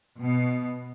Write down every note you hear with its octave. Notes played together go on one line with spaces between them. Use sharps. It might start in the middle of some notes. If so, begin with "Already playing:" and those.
B2